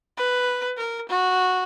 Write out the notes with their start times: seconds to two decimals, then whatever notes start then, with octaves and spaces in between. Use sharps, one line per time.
0.17 B4
0.77 A#4
1.09 F#4